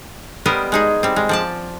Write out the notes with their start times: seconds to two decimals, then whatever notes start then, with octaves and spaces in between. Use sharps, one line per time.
0.46 G3 B3 G4 A#4 C5 D#5
0.72 G#3 D#4 G#4
1.03 G3 C4
1.16 G#3
1.29 F3 D5 A5